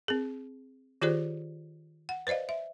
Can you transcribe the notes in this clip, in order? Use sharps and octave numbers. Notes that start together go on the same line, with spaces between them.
C4 G#4
D#3 F4 G4 G#4 C5 D5
F#5
B4 C5 D5 D#5 F5
E5